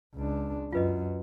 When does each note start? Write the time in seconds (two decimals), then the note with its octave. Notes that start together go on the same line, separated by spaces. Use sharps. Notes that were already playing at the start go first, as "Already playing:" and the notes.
0.16 C#2 D4
0.73 F#2 F4 B4 D#5